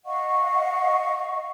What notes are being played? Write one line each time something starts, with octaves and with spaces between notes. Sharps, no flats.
D#5 F5 F#5 C#6